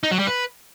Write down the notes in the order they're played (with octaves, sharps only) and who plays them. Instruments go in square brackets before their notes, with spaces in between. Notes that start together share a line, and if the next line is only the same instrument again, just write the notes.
[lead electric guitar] D#4
F#3
G3
B4